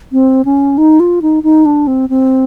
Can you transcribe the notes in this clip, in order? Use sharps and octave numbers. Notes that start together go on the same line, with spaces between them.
C4
C#4
D#4
F4
D#4
D#4
D4
C4
C4